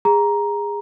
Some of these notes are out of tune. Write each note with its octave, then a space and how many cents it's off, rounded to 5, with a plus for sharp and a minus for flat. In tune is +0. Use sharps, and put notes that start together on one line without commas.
G#4 -20 A#5 +10